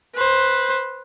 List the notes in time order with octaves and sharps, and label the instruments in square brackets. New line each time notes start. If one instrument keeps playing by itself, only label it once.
[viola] B4 C5